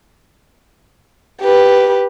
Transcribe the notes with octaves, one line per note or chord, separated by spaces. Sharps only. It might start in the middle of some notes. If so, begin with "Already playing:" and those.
G4 B4